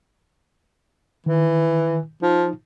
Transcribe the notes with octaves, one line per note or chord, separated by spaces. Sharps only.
D#3 E3
F3 D#4